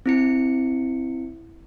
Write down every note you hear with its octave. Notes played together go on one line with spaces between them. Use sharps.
C4 E4 C#7